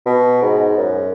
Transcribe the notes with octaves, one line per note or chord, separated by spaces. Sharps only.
B2
G#2
F#2